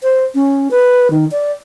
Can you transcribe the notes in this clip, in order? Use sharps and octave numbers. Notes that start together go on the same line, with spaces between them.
C5
C#4
B4
D#3
D5